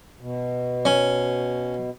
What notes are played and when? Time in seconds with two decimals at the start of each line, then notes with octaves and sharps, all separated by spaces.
0.21 B2
0.85 C#4